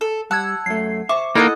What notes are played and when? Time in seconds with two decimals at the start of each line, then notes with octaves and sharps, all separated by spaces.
0.01 A4
0.31 G3 F#5 A5 E6 G#6
0.66 F#2 A3 C7
1.09 C5 E5 C#6 D6
1.35 A#3 D#4 E4 A4 D#5 F#5